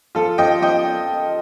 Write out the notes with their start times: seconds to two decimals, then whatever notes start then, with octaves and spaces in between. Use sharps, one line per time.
0.15 F3 F4 A4
0.38 F3 D#5 G5
0.62 F3 D#5 G5